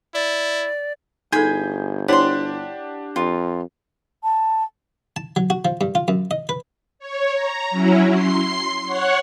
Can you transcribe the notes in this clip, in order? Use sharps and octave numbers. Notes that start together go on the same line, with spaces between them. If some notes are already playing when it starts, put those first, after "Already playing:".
E4 D5
G1 D#4 G#4 A4 B5 G6 G#6
D4 E4 G4 C5 C#5 F#5 C6
F2 F4
A5
A5
F#3
F#4
F3
G2
F4
F#2
D#5
B4
C#5
A#5
F#3 C#4 E4
C6 C7
C#5 F#5 C#6 F#6